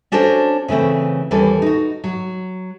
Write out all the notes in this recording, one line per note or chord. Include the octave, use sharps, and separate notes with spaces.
C#4 D4 F#4 A4 C5 C#5
C#3 E3 A3 C4
D#2 E3 G3 C#4 A4
D#4 F#4
F#3